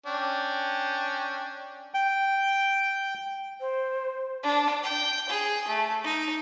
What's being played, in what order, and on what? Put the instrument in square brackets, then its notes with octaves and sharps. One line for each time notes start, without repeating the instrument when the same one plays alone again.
[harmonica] C#4 D4 G5
[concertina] G5
[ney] C5
[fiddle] D4
G5
G#4
A3
D#4